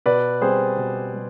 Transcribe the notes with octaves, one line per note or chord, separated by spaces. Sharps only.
B2 B4 D5
G3 C4 G#4 C5
B2
G3